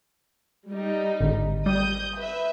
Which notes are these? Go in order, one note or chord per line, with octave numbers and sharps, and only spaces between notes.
G3 D#4
G#1 D3
G3 D#6 G6
B4 E5